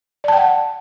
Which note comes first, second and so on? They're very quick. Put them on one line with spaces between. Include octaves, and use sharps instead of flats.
D5 A5 G5 F#5